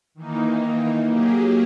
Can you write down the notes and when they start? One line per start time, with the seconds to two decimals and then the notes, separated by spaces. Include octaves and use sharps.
0.14 D#3 E3 A#3 D#4
1.05 F#3 A#3 G4 G#4